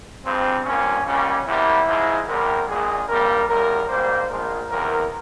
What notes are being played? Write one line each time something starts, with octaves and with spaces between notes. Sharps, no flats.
G2 F3 G#3 C4
G2 F3 A#3 C#4
C#2 C#3 G3 A#3 C#4
E2 C3 G3 A#3 E4
G#2 F3 G#3
E2 C3 G3 A#4
A#1 A#2 G#3 G#4
G#1 G2 G3 A#3 A#4
E2 C#3 G3 A#4
G#2 G3 A#3 C5
A#1 A#2 F3 G#3 A#4
E2 C3 E3 A#4